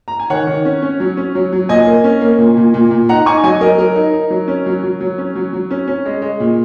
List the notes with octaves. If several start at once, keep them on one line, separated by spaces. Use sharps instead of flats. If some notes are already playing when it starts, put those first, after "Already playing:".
A#5
G#5
D#3 C#5 F#5
D#3
C#4
C#4
F#3
C#4
F#3
F#3
A#2 D#5 G#5
A#3
C#4
A#3
A#2
A#2
A#2
A#2
D#4 F#5 A#5
D#4 G#5 C#6
F#3 D#5 G#5
F#3 A#4 D#5
F#3 A#4
D#4
D#4
F#3
C#4
F#3
F#3
F#3
C#4
F#3
F#3
C#4
C#4
G#3
G#3
A#2